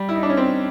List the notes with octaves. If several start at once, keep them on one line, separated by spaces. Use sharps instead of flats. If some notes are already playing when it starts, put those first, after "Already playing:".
Already playing: G3
E4
D#4
D4
C#4
C4